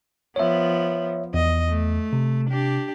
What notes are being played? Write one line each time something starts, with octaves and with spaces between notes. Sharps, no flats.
F3 B3 C#5 E5
E2 D#5
A3
C3
D4 G4